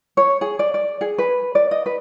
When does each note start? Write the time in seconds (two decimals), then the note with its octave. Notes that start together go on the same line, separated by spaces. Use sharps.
0.17 C#5
0.41 G#4
0.59 D5
0.74 D5
1.01 G#4
1.18 B4
1.55 D5
1.71 D#5
1.86 B4